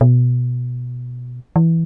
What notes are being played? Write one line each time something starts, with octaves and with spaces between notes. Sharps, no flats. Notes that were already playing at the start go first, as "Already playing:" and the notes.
B2
E3